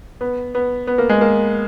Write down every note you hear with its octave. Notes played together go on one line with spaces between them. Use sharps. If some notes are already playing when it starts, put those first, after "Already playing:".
B3
B3
B3
A#3
G#3
A#3